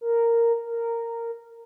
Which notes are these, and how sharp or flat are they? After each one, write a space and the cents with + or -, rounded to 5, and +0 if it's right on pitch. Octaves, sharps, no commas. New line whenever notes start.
A#4 -5
A#4 -10